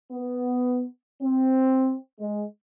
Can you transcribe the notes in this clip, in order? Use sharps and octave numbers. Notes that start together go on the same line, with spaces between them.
B3
C4
G#3